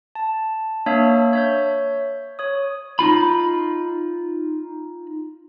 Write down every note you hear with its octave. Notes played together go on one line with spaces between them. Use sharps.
A5
A#3 D4 C#5 E5
C#5 E5 G6
C#5 D#6
D#4 F4 B5